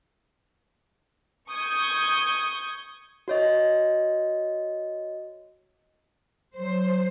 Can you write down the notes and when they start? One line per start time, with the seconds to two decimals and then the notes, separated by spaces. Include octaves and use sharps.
1.50 C#6 D#6 G6 G#6
3.28 F#4 C#5 D#5
6.56 F#3 C5